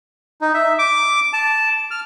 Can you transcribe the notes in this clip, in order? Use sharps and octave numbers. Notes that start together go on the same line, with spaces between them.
D#4
E5
D6
A5
F6